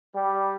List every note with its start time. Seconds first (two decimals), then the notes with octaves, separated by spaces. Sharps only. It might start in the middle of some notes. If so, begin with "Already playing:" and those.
0.14 G3